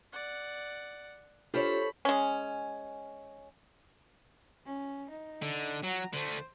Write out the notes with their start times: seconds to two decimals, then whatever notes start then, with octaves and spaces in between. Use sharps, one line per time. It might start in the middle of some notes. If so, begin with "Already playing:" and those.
0.13 D5 F#5
1.54 D4 F4 G4 A4 C5 C#5 B5
2.05 G#3 C#4
4.65 C#4
5.10 D#4
5.42 D3
5.83 F#3 F#5 A#5
6.13 D3 A3 C5